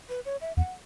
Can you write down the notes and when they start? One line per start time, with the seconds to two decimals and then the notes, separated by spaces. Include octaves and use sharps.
0.09 B4
0.25 C#5
0.41 E5
0.57 E2 F#5